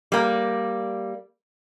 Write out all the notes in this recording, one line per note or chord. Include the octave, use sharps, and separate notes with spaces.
G3 A#3